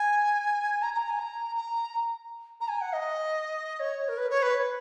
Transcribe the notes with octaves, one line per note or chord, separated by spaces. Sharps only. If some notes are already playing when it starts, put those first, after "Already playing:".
Already playing: G#5
A#5
A#5
G#5
A#5
A#5
A#5
G#5
F#5
D#5
C#5
A#4
B4
C#5
B4